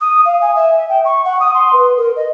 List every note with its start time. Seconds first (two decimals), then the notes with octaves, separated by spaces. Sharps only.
0.01 D#6
0.25 F5
0.41 G#5
0.56 E5
0.89 G5
1.05 C#6
1.24 F#5
1.40 D#6
1.54 C6
1.73 B4
1.97 A#4
2.16 D#5